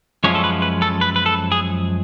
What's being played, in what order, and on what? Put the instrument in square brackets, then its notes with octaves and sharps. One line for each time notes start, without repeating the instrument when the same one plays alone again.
[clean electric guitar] F#2 F3 G#3 C#4 F4 C#5
A4
B4
B4
A4
B4
B4
A4
G#4